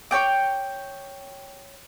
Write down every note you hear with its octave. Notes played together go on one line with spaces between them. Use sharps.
C#5 G5 D6